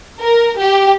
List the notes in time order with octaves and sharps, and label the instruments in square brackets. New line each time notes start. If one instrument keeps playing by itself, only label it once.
[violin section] A#4
G4